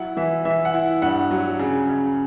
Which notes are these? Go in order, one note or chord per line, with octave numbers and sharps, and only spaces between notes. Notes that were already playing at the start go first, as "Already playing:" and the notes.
Already playing: F#3 E4 F#5
E3 E5
E3 E5
F#5
E4
G2 F#5
F#3
C#3
C#3